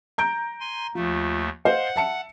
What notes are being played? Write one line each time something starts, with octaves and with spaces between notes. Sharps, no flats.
A#5 G6 D7
G#5 C6
D#2 F3 A3
C5 D#5 F5 F#5
E5 A5 C#7